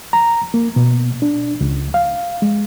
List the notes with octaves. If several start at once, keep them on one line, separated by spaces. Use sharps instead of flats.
A#5
A#3
B2
D4
C#2
F5
G#3